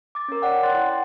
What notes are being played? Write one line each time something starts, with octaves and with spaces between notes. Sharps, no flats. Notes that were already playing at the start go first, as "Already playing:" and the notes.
D6 A6
C#4 A#4
C#5 D5 F#5 G5
G5 C6 F#6 A6
E4
F#5